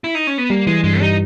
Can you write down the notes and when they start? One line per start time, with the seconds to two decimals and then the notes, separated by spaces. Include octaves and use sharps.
0.04 E4
0.15 D#4
0.27 C#4
0.38 B3
0.50 G3 A#3
0.67 E3 G#3
0.84 G2 G#3
1.01 G3 D#4